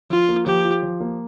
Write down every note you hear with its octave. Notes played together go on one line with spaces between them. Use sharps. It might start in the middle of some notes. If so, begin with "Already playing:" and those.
F3 F4
A#3
F3 G4
F4
F3
A#3